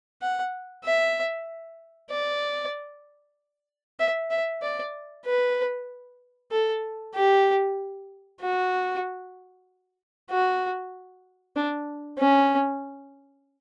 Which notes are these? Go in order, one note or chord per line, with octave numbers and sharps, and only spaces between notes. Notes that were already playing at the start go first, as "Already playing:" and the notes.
F#5
E5
D5
E5
E5
D5
B4
A4
G4
F#4
F#4
D4
C#4